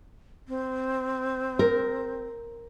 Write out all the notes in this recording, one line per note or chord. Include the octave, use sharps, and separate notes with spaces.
C4
A#4